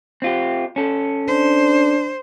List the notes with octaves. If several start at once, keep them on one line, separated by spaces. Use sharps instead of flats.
C4 F4 G4
C#4 A4
D4 C5